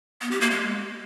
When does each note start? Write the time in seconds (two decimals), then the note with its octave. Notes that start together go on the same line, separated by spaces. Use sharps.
0.21 B3
0.31 G4
0.41 A#3
0.51 G#3